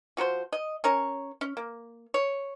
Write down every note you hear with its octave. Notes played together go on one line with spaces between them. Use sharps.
F3 F#4 A#4 C5
D#5
C#4 A#4 C#5
C#4
A#3
C#5